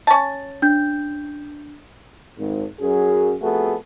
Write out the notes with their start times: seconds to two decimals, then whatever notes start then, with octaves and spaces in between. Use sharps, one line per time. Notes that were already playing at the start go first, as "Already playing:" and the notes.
0.07 C#4 A5
0.62 D4 G6
2.38 G#1
2.80 F#2 G#4
3.42 F2 A3 B3 F#4 G#4 A4